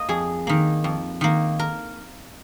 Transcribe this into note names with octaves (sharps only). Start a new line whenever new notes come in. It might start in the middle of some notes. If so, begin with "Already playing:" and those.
Already playing: A#3 D#5
F2 G#4
D#3 A#3
F2
D#3 A#3
A#4